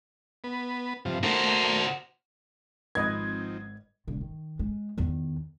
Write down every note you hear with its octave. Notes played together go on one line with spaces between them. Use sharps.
B3
G2 C3 F3
A3 A#3 F#4 C5
G#1 F3 C4 D#4 B4 D#5 G#6
E1 D3
D#3
G#3
E2 D#3